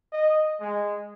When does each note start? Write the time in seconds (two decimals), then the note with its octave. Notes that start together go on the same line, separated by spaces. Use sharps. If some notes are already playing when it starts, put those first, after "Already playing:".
0.13 D#5
0.61 G#3